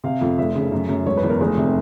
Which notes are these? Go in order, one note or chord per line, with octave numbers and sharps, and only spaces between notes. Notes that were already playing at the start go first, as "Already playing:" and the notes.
C3 F5
F2
F1 E5
C#3
F#2
F#2
E1 C#5
B4
E2
A#4
F1 G#4
C3